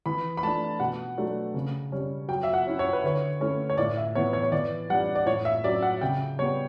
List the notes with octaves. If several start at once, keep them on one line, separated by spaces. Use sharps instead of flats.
E3 B5
B5
A3 D4 A5
B2 F#5
F#3 A3 D4
C#3
G3 C#4
F#3 G5
E5
F#5
C#4 E4
C#5
B4
D3 C#5
A3 C#4 E4
C#5
A2 D5
E5
E3 B3 C#5
C#5
C#5
E3 D5
G3 D4 F#5
D5
A2 C#5
E5
F#3 C#4 D5
F#5
C#3 G5
G3 B3 C#5